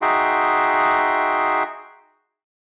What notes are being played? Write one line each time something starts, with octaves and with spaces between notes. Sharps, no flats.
D#4 F#4 G#4 E5 G5 C6